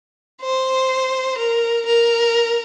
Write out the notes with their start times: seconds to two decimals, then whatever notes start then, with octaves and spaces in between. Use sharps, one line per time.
0.42 C5
1.38 A#4
1.86 A#4